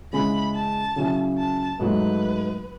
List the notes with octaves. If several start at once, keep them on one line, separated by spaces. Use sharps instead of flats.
C#3 G#3 C#4 E4 B5
A5
C#3 F#3 C#4 E4
A5
G#2 F#3 A3 D#4 B4